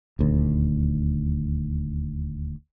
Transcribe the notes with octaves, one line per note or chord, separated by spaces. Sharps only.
D#1 D2